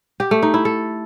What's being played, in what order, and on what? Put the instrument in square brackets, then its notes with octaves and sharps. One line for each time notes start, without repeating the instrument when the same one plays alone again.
[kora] G4
A3
D#4
E4
A4